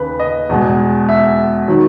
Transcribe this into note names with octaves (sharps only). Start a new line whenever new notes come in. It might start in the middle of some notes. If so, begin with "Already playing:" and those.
Already playing: D#2 C#3 B4
D#5
E2 B2 G#3
E5
D#3 F#3